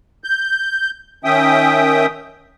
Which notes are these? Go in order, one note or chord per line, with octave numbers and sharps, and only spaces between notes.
G6
D#3 C#4 E5 G5 D#6